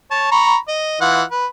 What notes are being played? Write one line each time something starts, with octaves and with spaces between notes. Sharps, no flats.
C#5 A5
A#5 B5 C#6
D#5
E3 F4 F#5
B4